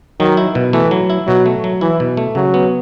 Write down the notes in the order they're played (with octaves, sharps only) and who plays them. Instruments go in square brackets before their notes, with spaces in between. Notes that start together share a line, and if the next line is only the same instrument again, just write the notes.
[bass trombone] D#3 [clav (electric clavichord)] F#3
[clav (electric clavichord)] E4
B2
[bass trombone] E3 [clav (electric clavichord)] A3
[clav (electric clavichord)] F#3
E4
[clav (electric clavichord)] B2 [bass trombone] F#3
[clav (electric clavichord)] A3
F#3
[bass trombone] E3 [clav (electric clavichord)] E4
[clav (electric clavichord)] B2
A3
[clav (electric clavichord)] C#3 [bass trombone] F#3
[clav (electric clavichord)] B3